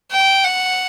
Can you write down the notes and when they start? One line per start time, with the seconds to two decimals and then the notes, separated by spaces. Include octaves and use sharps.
0.12 G5
0.44 F#5